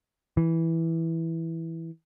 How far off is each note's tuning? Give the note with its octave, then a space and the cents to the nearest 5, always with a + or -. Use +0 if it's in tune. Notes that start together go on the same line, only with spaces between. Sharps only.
E3 -5